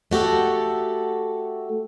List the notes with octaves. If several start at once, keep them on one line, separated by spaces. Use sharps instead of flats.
A3 F#4 G4 A4